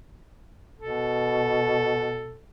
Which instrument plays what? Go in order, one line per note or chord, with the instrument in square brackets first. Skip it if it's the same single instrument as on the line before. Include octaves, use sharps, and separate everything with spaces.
[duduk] B2 [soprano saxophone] A4